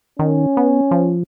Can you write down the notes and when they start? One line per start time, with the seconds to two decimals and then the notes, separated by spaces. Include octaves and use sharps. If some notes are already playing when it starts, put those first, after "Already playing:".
0.19 D#3 C#4
0.57 B3
0.91 F3